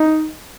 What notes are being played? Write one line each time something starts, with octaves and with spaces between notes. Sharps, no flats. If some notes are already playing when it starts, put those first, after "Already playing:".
Already playing: D#4